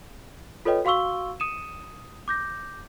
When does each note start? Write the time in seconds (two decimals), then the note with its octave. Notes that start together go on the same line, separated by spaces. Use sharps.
0.65 F4 A4 B4 C#5 D#5 G5
0.85 F#4 F5 C6 C#6 E6 G7
1.40 D#6 C#7 D#7 E7
2.28 D6 G6 A#6